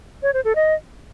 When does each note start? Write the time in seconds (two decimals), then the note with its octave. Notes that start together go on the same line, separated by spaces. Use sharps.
0.23 C#5
0.34 C5
0.45 A4
0.55 D#5